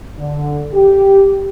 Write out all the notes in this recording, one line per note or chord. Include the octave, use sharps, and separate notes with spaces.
D3
G4